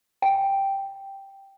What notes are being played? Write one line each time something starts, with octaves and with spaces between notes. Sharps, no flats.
G5